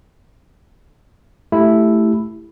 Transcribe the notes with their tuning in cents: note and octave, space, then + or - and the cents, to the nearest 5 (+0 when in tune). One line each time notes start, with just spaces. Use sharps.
A3 +0 E4 +0 G4 +0